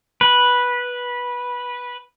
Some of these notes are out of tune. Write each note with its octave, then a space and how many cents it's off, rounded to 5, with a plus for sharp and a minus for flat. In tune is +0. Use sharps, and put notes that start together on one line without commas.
B4 -10